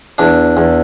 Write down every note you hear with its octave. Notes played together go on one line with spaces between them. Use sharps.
E2 D4
E2